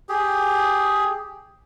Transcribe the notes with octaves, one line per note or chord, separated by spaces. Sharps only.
G4 G#4